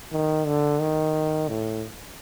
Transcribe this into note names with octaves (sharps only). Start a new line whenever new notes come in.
D#3
D3
D#3
A2